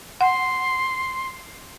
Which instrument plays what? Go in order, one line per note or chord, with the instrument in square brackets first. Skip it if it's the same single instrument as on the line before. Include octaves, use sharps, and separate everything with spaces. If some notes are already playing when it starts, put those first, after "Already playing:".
[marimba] F#5 [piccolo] C6